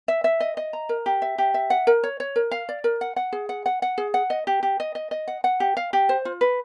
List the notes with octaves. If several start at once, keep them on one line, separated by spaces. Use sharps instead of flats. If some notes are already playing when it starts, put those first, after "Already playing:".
E5
E5
D#5
D#5
A#5
A#4
G4
E5
G4
E5
F#5
A#4
C#5
C#5
A#4
F5
D5
A#4
F#5
F#5
G#4
F#5
F#5
F#5
G#4
F#5
D#5
G4
G4
D#5
D#5
D#5
F#5
F#5
G4
F5
G4
C5
F4
B4